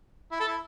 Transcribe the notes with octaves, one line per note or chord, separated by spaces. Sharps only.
E4
A4
E4